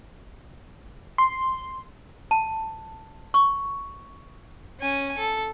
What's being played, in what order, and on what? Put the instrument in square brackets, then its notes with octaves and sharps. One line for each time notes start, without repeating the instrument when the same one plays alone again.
[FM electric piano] C6
[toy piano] A5
C#6
[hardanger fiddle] C#4 G#5
A4